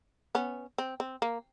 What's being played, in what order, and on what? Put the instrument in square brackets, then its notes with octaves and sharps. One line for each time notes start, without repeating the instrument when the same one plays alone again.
[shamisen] B3 C#4
C4
C4
A#3